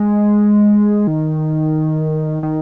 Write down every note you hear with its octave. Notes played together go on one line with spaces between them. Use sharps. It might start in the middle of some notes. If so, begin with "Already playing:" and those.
Already playing: G#3
D#3
D#3